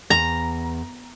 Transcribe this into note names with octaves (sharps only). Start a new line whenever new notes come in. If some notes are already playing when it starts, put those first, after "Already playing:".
E2 A#5